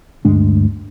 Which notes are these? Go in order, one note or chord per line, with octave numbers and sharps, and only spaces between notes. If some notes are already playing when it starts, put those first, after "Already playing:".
D2 G2 G#3 D4